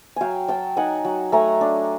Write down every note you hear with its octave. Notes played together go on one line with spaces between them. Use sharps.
F#3 F5 G5 G#5
F#3 G5 A5
D#4 F#5 G#5
F#3
A3 G#5 A#5
D4